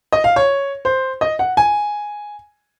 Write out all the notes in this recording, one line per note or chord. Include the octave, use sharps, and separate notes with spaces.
D#5
F5
C#5
C5
D#5
F#5
G#5